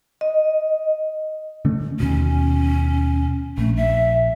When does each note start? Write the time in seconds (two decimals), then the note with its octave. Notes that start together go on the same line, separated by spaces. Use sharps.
0.21 D#5
1.65 D3 A3 C#4
2.00 D#2 B2 C#4
3.58 A#1 A3
3.77 E5